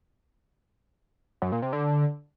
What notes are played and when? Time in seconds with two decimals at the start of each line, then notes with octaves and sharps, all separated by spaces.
1.42 F#2
1.52 A#2
1.62 C3
1.73 D3